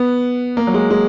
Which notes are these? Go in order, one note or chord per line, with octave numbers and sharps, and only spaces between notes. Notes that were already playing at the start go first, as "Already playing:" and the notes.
Already playing: B3
A#3
F#3
G#3
G#3